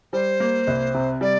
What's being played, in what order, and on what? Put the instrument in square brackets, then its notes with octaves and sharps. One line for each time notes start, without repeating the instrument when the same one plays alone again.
[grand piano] G3 [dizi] C5
[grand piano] A#3
C2
C3
[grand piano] G3 [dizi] D5